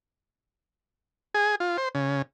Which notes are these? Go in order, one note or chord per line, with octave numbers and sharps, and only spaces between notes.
G#4
F4
C5
C#3